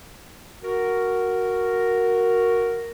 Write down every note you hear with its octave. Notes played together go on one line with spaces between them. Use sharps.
F#4 A#4